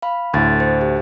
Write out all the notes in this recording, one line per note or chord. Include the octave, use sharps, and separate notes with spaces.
F5 B5
D2 A2 C6 G#6 A6
C5
G4